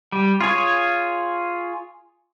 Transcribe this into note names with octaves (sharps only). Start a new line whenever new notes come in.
G3
F4 G#4 C#5